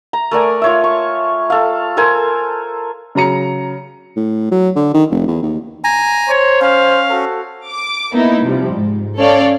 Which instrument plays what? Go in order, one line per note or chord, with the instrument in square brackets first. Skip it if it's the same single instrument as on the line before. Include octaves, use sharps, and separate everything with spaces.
[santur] A#5
A3 A#4 D5 G#5
F4 C#5 E5
C#6
A4 F5
A4 A#4 C5 G#5
[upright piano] C#3 F#3 A#5 C#7
[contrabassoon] A2
F#3
D3
D#3
F1
E2
D#2
[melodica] G#5 A#5
[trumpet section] C5 [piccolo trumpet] C#5
[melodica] C#4 [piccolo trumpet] F5
[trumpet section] F#4 A4
[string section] D6
A#3 B3 D#4 E4
C3 F3 G3
G#2
C#4 A4 C#5 D5 F5